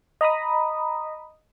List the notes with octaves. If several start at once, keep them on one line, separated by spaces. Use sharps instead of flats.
D#5 A#5 B5 D#6